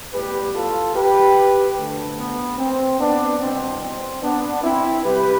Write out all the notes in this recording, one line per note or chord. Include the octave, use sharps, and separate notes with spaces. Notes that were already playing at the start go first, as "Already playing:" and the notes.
A2 G3 B3 G4 B4
F4 A4
G4 B4
D2 D3 A3
B3
C4
B3 D4
C2 B2 B3 C4
C4
B3 D4
C4 E4
C2 C3 G3 G4 B4